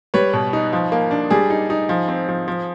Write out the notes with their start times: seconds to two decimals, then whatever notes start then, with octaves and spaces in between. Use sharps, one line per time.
0.14 G3 B4 C#5
0.34 B2
0.53 D#4
0.73 F3
0.92 A#3
1.11 D4
1.31 G3 G#4
1.50 D#4
1.70 D#4
1.89 F3
2.08 C4
2.28 F3
2.48 F3